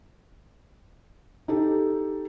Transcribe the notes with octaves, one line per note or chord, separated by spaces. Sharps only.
D#4 G4 A4